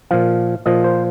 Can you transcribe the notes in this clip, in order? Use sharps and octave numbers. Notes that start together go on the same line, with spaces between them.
A#2 F3 F5
A#2 F3 D#5
C5